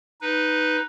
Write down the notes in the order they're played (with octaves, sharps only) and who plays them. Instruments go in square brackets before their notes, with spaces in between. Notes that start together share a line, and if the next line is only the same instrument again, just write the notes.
[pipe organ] D#4 B4